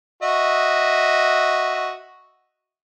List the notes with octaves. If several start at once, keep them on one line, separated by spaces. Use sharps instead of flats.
F#4 D#5 E5